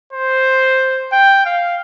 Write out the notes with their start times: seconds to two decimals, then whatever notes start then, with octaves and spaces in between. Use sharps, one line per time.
0.13 C5
1.12 G5
1.46 F5